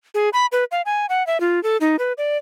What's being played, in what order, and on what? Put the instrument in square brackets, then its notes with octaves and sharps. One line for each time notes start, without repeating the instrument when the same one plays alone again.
[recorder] G#4
B5
B4
F5
G#5
F#5
E5
F4
A4
D#4
B4
D5